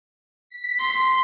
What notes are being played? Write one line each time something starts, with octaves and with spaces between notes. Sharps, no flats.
B6
C6